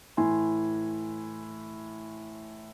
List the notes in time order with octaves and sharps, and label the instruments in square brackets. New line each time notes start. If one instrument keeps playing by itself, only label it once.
[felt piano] A2 E3 G#5 C6